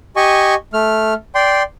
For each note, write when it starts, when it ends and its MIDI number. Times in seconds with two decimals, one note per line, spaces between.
0.16 0.55 67
0.16 0.55 75
0.16 0.55 80
0.16 0.55 85
0.73 1.14 57
0.73 1.14 89
1.35 1.63 74
1.35 1.63 79
1.35 1.63 84